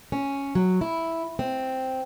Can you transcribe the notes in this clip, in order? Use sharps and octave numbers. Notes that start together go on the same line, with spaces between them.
C#4
F#3
E4
C4